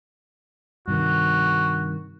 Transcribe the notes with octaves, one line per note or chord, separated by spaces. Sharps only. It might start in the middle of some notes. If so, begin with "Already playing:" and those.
G2 C3 D#3 F#4